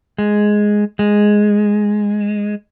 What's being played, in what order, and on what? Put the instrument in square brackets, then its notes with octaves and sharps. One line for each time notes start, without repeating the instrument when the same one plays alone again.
[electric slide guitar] G#3
G#3